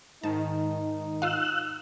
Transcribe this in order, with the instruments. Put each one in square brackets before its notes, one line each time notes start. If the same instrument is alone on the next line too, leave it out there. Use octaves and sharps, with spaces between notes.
[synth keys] G#2 D#3 [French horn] D#4 [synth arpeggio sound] A5
[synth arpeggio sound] F4 F5 [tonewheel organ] E6 F#6